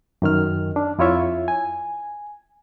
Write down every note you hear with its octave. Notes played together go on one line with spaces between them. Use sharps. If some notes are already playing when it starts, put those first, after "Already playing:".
F#2 D#3 F6
D4
F2 E4 F4 C#5 E5
G#5